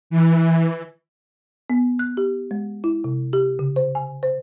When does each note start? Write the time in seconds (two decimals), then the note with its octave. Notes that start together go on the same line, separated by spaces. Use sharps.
0.10 E3
1.70 B3
1.99 F#6
2.17 G4
2.51 G#3
2.84 E4
3.04 C3
3.33 G4
3.59 C#3
3.76 C5
3.95 G#5
4.23 C5